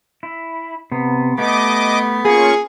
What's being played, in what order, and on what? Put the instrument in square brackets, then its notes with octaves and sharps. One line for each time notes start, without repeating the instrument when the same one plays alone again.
[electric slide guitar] E4
C3 B3
[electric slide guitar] A3 G4 [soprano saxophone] B3 [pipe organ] D#5 D6
[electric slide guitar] A#3 [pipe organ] C#4 F4 C#6 [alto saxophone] G#4